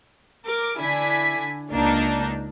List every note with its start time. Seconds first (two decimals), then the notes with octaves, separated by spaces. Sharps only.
0.45 A#4 D6
0.78 D3 D4 E4 G#5 B6
1.71 C#2 A#3 D4 D#4